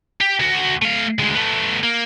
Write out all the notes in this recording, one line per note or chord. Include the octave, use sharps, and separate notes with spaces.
G4
D2 F#4
A3 F5
D2 G#3
A3 B3
A#3